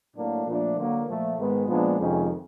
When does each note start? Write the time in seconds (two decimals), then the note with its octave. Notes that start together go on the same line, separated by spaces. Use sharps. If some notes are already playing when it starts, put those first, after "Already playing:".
0.15 A2 F#3 A#3 D4
0.46 A#2 F3 A3 D4
0.77 D3 F#3 A#3
1.07 A#2 F3 A3
1.38 G#2 D#3 G#3 B3
1.68 A#2 F3 G#3 B3 D4
1.98 F2 C3 D#3 G#3 C#4